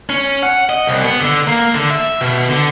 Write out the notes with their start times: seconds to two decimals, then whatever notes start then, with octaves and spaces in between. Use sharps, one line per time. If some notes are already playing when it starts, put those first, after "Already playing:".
0.10 C#4
0.43 F#5
0.69 D#5
0.87 C2
1.05 B3
1.20 D3
1.48 A#3
1.75 D3
1.90 E5
2.21 B2
2.49 D3